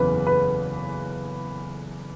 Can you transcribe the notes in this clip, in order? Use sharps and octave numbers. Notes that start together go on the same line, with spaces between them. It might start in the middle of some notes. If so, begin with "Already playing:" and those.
Already playing: F#1 E2 C#3 E3 B4
B4